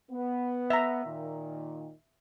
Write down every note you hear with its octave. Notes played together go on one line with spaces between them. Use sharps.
B3
E5 A#5
A#2 D#3